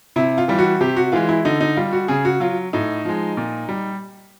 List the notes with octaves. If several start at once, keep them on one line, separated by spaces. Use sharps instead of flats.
C3 E4
F4
E3 G3
F#4
C3 G4
F#4
E3 G#3 F4
E4
D3 D#4
D#4
G3 F4
F#4
C#3 G#4
F#4
F#3 F4
A2 D#4
F3 G#3
A#2
G3